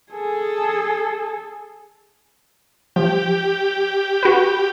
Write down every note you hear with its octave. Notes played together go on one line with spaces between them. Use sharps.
G#4 A4
F3 G4
F#4 B4